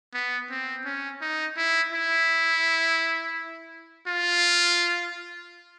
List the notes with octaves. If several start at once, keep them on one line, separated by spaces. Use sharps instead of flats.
B3
C4
C#4
D#4
E4
E4
F4